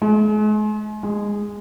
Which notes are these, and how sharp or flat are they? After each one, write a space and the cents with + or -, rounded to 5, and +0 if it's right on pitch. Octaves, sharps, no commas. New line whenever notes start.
G#3 +40
G#3 -15